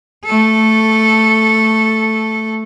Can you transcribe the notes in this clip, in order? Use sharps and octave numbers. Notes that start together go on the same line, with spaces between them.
A3 A4